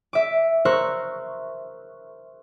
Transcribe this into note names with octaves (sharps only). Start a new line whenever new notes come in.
E5 D6
A#4 C5 C#6 E6 F#6